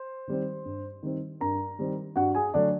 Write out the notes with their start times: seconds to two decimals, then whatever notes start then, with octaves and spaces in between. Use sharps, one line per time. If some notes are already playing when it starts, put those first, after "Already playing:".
Already playing: C5
0.28 D#3 G3 C4
0.65 G2
1.03 D#3 G3 C4
1.40 G2 A#4 A#5
1.79 D#3 G3 C4
2.16 G2 F#4 F#5
2.35 G#4 G#5
2.54 D3 F#3 A3 D4 D5